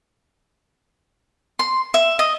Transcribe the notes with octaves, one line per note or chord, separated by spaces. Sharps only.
C6
E5
D#5